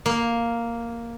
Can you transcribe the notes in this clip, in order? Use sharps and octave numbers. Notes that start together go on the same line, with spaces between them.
A#3